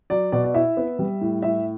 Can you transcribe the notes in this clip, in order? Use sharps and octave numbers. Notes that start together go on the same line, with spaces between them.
F#3 D5
B2 D5
D5
E4 E5
B3
G3
A2
A2 E5